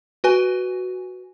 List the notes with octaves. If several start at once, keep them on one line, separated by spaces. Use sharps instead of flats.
F#4 B4 G#5